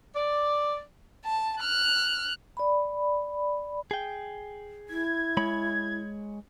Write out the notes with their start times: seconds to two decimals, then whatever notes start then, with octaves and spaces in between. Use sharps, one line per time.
0.16 D5
1.25 A5
1.61 F6 F#6
2.57 D5 B5
3.91 G#4 G5
4.89 E4 G#6
5.37 G#3 C#5 B5